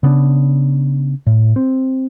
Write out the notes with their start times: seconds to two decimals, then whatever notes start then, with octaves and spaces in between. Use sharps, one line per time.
0.03 C#3 B3 C#4 D4
1.27 A2
1.56 C4